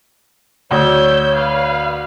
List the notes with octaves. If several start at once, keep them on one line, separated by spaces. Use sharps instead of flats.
D2 C#5 E6 G6
B4 F5